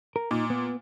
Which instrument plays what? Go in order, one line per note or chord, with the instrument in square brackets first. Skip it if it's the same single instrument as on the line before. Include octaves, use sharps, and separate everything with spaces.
[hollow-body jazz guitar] A#4
[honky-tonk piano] A#2 [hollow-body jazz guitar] D#4
[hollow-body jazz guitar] B3